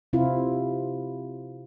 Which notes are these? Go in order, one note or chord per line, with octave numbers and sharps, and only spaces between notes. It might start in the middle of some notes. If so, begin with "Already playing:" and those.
C3 C4 E4 F4